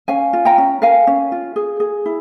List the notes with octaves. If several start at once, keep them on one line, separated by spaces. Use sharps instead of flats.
C#4 F5 G#5
F4
G5 A#5
C#4
A#4 F5 G#5
C#4
F4
G#4
G#4
E4